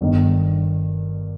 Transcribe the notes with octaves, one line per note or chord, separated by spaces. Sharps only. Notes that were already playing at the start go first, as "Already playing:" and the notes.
G1 G2 D#3